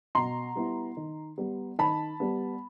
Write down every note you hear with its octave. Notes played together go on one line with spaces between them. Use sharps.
B2 A#5 C6
G3 B3 E4
D#3
G3 B3
D#3 A5 B5
G3 B3